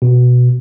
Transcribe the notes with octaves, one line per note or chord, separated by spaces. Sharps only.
B2